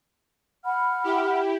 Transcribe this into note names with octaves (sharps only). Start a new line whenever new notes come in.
F#5 B5 F6
E4 G4